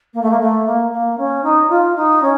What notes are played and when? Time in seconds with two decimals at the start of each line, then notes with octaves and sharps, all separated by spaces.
0.14 A#3
0.22 A3
0.31 A#3
0.40 A3
0.66 A#3
0.92 A#3
1.18 C#4
1.44 D#4
1.70 F4
1.96 D#4
2.22 C#4